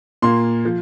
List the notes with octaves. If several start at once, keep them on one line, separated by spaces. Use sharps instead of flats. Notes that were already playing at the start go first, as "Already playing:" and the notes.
A#2 A#3 C6
F3